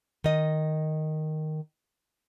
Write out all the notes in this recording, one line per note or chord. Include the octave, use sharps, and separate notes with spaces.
D#3 D#5